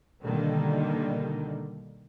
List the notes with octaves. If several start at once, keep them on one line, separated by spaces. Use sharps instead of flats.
B2 D3 D#3 G3 A#3